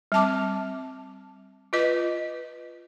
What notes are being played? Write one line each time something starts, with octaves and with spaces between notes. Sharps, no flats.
G3 C4 A5 D6
F4 B4 D#5